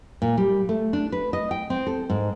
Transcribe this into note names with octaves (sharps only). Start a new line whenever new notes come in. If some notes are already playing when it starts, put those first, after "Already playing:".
A#2
G3
A3
D4
B4
D#5
G5
C4
A4
G#2